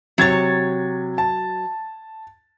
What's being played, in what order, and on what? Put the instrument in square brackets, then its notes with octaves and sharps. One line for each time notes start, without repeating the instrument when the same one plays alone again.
[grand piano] C3 G#6 A6 [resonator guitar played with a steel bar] F#3 C#5
[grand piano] A5